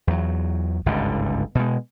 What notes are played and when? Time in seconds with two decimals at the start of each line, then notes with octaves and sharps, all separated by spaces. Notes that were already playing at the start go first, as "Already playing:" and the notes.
0.07 E2 F#3
0.86 G1 C#2 G#2 D3
1.55 B2 G#3